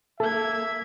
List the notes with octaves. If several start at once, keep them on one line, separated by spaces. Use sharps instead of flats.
A#3 A4 E5 G#6